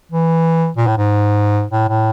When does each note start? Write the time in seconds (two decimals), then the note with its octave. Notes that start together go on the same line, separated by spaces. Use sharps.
0.12 E3
0.76 A#2
0.87 A2
0.97 G#2
1.71 A2
1.88 A2